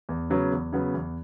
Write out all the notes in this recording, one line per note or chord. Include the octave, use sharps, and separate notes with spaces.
E2
C#3 F#3 B3
E2
C#3 F#3 B3
E2